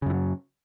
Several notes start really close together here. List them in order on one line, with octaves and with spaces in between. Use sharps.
C#3 F#2 E3 F#3